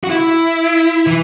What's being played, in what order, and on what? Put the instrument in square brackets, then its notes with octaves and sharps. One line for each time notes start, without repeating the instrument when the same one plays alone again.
[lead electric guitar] F#4
E4
E3